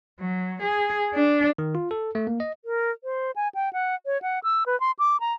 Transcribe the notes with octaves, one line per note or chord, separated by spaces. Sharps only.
F#3
G#4
D4
D#3
F4
A4
A3
A#3
D#5
A#4
C5
G#5
G5
F#5
C#5
F#5
E6
B4
C6
D6
A#5